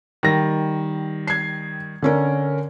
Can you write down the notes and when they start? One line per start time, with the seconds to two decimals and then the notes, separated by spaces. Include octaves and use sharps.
0.23 D#3 G3 A#6
1.27 G#6 C7
2.02 D3 C#4 A#4